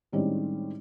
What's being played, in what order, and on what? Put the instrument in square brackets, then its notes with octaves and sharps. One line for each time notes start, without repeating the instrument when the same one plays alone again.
[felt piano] A2 D#3 G3 G#3 C4 C#4